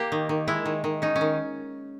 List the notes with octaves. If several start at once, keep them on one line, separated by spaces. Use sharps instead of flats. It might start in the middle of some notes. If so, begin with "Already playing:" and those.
Already playing: A#3 G4
D#3
D#3
G#3 E4
D#3
D#3
C#4 D#4
C#4
D#3